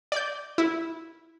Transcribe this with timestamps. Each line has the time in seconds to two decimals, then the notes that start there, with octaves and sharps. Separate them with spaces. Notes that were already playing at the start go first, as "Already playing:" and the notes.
0.12 D5 G6
0.58 E4